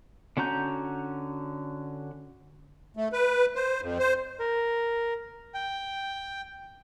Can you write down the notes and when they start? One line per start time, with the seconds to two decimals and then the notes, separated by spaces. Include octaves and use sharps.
0.37 D3 C#4 F#4 A#5 G6
2.97 A3
3.12 B4
3.55 C5
3.81 F2
3.99 C5
4.40 A#4
5.54 G5